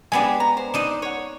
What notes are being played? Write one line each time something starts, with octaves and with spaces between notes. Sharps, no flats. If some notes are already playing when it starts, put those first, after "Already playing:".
G#3 B3 D4 G4 G#5
A#5
C5
D4 D#4 D#5
C#5 F#5